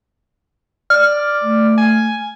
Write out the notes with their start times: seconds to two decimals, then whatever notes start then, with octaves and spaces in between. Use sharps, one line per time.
0.90 D5 F6
1.42 A3
1.78 G#5